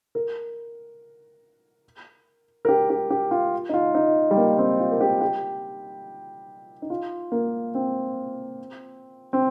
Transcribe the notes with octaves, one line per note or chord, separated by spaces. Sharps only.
A#4
A#4
G4
G4
G4
F4
D#4
F4
D#4
G3
A#3
C4
F4
A#4
G4
G4
D#4
F4
A#3
C4
C4